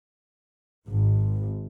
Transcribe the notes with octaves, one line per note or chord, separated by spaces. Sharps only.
G#1